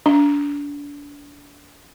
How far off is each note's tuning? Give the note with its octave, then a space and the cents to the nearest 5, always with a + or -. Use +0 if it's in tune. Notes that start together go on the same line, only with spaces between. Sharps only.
D4 -30